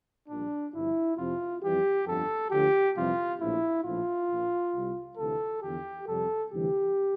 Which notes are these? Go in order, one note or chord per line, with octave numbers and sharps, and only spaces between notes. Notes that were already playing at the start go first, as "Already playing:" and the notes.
A#1 A#2 G3 D4
G1 G2 F3 E4
F2 C3 F3 F4
F2 E3 G3 G4
G1 F2 D3 F3 A4
D2 D3 F3 G4
F2 C3 E3 G3 F4
A#1 A2 F3 E4
A#1 A2 F3 F4
A#1 A#2 F3
C2 C3 G3
D2 C3 E3 A4
E2 D3 F3 G4
F2 C3 G3 A4
D2 C3 E3 G3 G4